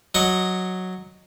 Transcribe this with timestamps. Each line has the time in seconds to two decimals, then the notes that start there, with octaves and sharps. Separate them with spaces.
0.15 F#3 D#5 C#6